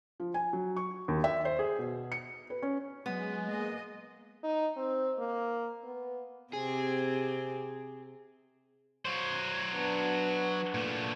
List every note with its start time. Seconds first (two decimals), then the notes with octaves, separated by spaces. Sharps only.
0.20 F3
0.34 G#5
0.53 F#3
0.77 C#6
1.08 D#2
1.24 E5
1.45 C5
1.59 G#4
1.79 B2
2.12 C#7
2.50 B4
2.62 C#4
3.06 F#3 G#3 B3
3.48 A#3 D#5
4.43 D#4
4.77 C4
5.18 A#3
5.84 B3
6.53 C3 C4 G4 G#4
9.05 F#3 C5
9.73 B3 D4
10.74 A#2 A3